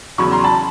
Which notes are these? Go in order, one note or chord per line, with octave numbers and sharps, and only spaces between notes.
E2 C#3 F#3 B5 C#6
A#5 C6
A5 B5